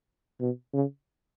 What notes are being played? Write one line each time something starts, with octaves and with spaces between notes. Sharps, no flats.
B2
C#3